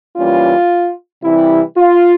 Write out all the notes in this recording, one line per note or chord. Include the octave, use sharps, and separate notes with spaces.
E3 G3 A#3 C#4 F4
C3 E3 G3 E4
F4